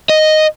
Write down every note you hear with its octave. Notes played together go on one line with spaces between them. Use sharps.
D#5